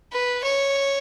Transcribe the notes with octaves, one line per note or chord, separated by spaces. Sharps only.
B4
C#5